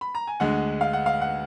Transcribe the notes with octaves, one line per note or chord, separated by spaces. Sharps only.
B5
A#5
G#5
D2 D3 G#3 F#5
F5
F#5
F5
F#5